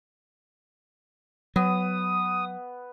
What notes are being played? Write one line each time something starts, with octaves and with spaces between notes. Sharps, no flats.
F#3 B3 D#6